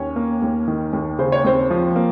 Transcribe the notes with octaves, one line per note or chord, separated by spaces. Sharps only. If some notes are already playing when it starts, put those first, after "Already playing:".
Already playing: D#2 C#4 C#5
A#3
D#2
D#3
D#2
C#3 C5
C#5
D#2 C4 C5
F3
A#3